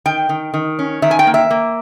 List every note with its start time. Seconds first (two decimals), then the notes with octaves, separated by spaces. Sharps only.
0.06 D#3 G5
0.29 D#3
0.54 D#3
0.79 C#4
1.02 D#3 E5
1.11 G#5
1.19 G5
1.27 A#3
1.34 E5
1.51 A#3